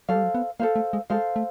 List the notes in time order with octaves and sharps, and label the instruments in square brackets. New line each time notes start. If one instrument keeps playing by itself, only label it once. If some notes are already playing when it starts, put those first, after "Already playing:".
[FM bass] F#3 [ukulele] A4 C5 F5
[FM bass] G3
F#3
B3
[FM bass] A#3 [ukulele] A4 C5 F5
[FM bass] A3
G#3
[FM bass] G#3 [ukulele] A4 C5 F5
[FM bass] A3